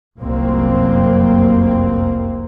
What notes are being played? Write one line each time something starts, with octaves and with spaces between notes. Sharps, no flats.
F1 C2 F#2 A#3 C4